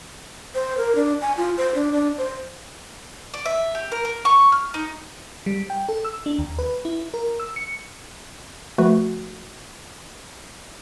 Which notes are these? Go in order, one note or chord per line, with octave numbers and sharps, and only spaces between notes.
C5
A#4
D4
G#5
F4
C5
D4
D4
C5
D5
E5
G4
A#4
A#4
C#6
F6
D#4
G3
G5
A4
E6
D4
D#2
B4
E4
A#4
E6
C#7
F3 A3 F#4 B4